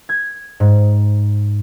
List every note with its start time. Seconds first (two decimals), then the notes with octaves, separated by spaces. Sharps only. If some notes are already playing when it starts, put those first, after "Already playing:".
0.09 G#6
0.60 G#2